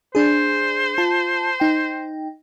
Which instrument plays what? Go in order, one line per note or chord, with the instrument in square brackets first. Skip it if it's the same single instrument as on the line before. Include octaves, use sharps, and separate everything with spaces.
[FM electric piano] D4 G#4 [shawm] C5
[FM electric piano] F4 A5
D#4 G5